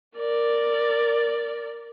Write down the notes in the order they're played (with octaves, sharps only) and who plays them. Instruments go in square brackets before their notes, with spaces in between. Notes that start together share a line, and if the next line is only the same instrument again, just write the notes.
[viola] A#4 D5